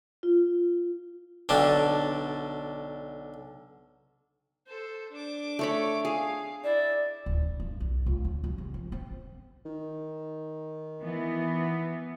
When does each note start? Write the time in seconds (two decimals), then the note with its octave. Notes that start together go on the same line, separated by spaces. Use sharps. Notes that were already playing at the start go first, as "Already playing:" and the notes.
0.23 F4
1.49 B1 D3 D4
4.67 A4 C5
5.11 D4 D6
5.59 A3 C#5 B5
6.05 G#4 F5
6.64 E4 D5
7.26 D1
7.43 D#4
7.60 G2
7.80 B1
8.06 C#2
8.25 D2
8.44 F#2
8.58 C2
8.74 F3
8.92 C4
9.65 D#3
11.02 E3 B3